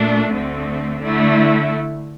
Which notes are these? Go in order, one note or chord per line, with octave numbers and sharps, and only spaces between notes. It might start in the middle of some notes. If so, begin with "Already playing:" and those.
Already playing: A#2 A3 D4
D2 D3 A3 C4
D3 A3 E4